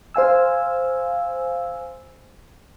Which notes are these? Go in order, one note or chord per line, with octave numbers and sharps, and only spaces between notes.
C5 F5 G#5 E6